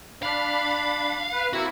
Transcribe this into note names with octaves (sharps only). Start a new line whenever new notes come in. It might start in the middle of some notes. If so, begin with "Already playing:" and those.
D4 F5 B5
B4
A#3 C4 E4 F#4